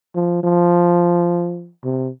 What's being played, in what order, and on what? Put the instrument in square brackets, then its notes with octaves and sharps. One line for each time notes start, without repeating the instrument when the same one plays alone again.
[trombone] F3
F3
C3